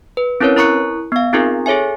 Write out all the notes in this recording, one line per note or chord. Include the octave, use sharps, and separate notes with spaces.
B4
C4 C#4 E4 A#4 B4 C#5
E4 A#4 A#5 C#6 F#6 C#7
B3 F5
C4 D#4 F4 G#4 A#4
G#4 A4 C#5 E5 G#5